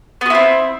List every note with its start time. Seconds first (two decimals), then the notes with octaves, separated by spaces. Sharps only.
0.21 B3
0.26 F#4
0.30 E4
0.35 C4